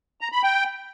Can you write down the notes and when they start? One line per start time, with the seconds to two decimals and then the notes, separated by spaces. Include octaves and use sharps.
0.21 A#5
0.32 B5
0.43 G5